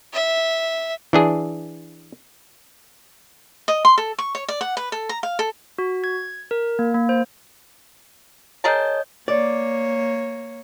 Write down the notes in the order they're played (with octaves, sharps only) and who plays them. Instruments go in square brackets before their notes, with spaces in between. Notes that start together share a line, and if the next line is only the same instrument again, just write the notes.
[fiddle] E5
[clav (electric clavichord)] E3 D4 G#4
[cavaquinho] D#5
C6
A4
C#6
C#5
D5
F#5
B4
A4
A#5
F5
A4
[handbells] F#4
G#6
A#4
A#3
A#3
C5
[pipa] G#4 A#4 A5 [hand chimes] C#5 D#5 G6
[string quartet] A#3 C#5 [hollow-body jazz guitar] D5